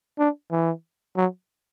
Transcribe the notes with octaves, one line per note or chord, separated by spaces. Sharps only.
D4
E3
F#3